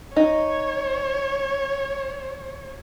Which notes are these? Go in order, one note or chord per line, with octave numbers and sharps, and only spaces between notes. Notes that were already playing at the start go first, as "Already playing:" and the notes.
D#4 C#5